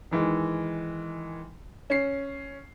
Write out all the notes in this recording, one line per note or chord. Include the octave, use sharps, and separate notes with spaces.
D#3 E3 G#3
C#4 C7